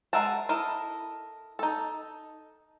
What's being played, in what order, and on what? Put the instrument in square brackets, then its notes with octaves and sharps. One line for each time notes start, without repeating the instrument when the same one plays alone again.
[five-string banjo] G#3 A#4 E5 F#5 A5
E4 A4 A#4 D#5
D#4 A4